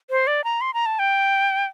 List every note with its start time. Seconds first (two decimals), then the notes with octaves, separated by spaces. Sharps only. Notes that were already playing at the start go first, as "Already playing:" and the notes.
0.10 C5
0.27 D5
0.44 A#5
0.61 C6
0.74 A#5
0.86 A5
0.99 G5